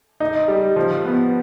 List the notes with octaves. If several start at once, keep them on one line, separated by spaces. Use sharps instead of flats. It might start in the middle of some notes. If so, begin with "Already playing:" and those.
D#4
G3
F3
B3